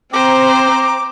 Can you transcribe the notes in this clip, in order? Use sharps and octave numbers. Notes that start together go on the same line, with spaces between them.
C4 C5 A#5 D6